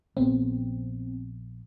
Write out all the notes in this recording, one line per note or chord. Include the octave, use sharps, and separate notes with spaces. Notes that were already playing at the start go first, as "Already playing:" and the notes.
A#1 B3 C4